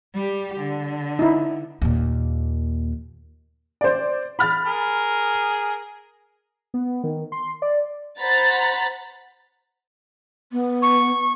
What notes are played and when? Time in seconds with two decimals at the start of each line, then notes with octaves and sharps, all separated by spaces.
0.15 G3 G4
0.59 D3
1.19 D#4 E4
1.82 D#2 A#2
3.81 C5 D5
4.39 B5 F6 A6
4.66 G#4 A#4
6.74 B3
7.04 D#3
7.32 C6
7.62 D5
8.20 C5 F#5 A#5 B5 A6
10.52 B3
10.82 C#6